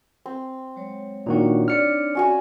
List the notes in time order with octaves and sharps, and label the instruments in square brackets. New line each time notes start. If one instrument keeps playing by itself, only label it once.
[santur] C4
[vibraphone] F#3 G#3 C#5
[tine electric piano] A#2 D#3 F#4 [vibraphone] D4 D#4 C#5
[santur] D5 F#5 [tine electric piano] F6 C#7
[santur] C#4 F#4 G#5